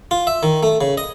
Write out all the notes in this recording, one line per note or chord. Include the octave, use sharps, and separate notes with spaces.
F4
E5
D#3
A3
C#3
D#5